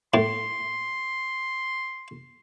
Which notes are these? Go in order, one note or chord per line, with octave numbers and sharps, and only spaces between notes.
A2 C6